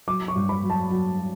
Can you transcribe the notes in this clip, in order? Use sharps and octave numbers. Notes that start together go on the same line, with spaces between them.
F#3 D6
C#6
G2
B5
F#3
A5
F#3